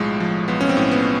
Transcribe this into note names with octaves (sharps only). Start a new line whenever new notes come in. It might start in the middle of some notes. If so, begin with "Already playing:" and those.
Already playing: B1 A2 F3 G#3
F3
B1 B3
C#4
C4
A2
B3